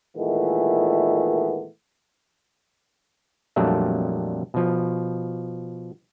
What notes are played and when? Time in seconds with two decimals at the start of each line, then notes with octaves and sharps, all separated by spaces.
0.16 A#2 D#3 E3 G#3 A3 B3
3.56 F2 A#2 F#3 G3 A3 D4
4.54 B2 F3